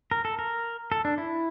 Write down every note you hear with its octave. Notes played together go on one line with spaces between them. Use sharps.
A#4
A4
A#4
A4
D4
E4